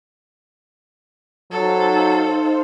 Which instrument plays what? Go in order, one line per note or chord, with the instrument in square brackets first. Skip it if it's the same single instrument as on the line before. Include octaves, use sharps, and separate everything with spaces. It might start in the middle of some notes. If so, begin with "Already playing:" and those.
[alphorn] F#3 [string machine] D#4 C5 F5 [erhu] A4